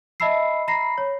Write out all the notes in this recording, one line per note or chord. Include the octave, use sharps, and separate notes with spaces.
D#5 E5 A5 B5 E6 C7
A#5 B5 A#6 C7
C#5